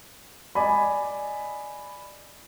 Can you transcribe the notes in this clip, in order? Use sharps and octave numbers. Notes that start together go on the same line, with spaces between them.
D5 D#5 G#5 B5